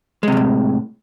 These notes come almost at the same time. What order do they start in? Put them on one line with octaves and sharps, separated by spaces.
G#3 C3 E2 A2